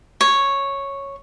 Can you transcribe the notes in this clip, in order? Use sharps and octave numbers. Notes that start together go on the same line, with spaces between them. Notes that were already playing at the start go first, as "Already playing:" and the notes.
C#5